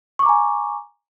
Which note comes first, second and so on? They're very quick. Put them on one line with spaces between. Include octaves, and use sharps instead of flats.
C#6 D6 A#5 G#5